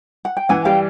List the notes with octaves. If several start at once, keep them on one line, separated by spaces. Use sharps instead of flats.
F#5
G5
E3 F#5 G#5
G3 F5 G5